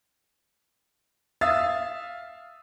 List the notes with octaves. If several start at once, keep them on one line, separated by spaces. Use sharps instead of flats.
E5 F5 D#6 E6 A6